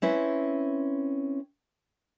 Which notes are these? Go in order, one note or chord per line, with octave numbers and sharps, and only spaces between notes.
C4 C#4 E4 B4